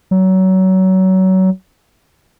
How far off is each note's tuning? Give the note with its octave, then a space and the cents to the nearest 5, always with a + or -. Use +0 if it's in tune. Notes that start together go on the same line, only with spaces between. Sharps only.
F#3 +25